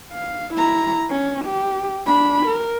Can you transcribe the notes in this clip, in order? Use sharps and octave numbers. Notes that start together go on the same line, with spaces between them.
F5
E4 A#5
C#4
G4
D4 B5
A#4